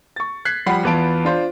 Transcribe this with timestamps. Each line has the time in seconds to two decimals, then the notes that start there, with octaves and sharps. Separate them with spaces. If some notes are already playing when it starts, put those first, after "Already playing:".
0.16 C#6 A6
0.45 F#6 G#6 B6 C7
0.66 F3 G3 F#5 B5 C7
0.83 E2 E3 B3 F4 A5 D7
1.25 D4 F4 C5